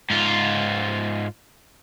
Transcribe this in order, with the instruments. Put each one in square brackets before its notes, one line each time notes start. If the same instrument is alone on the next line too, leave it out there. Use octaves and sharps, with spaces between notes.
[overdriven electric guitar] G#2 F4